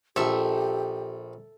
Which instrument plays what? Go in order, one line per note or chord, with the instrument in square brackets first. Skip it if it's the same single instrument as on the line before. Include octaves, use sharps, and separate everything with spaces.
[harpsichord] A#1 [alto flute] G4 [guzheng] A4 E5